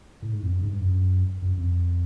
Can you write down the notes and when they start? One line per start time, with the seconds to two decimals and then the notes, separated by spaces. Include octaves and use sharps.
0.22 A2
0.32 G#2
0.42 F2
0.52 F#2
0.61 G#2
0.67 G2
0.82 F#2
1.42 F#2
1.57 F2